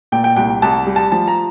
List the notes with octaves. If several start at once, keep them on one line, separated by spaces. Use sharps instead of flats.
A#2 G5
G5
C2 G5
C2 A5
G3
A5
F3 A5
A#5